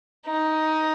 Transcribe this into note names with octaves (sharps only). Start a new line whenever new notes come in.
D#4